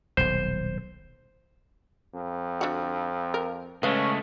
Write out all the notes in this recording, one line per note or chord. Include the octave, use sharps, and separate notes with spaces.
D#1 B1 C5
F2
D3 F#4
A#4
C#3 G#3 A3 C#4 B4 F5